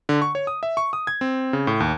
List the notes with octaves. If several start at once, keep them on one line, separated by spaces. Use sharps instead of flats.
D3
C#6
C#5
D#6
E5
C#6
D#6
G#6
C4
C#3
A2
D#2